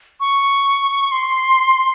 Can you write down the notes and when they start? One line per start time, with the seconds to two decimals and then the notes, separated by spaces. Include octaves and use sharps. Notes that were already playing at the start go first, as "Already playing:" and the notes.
0.20 C#6
1.12 C6